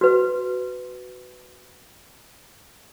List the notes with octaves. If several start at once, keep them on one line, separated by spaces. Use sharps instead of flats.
F#4 B4